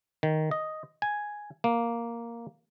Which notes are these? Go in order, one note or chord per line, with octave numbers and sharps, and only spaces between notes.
D#3
D#5
G#5
A#3